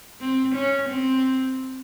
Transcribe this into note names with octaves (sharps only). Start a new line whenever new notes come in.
C4
C#4
C4